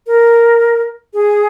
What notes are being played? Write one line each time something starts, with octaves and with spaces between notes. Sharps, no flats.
A#4
G#4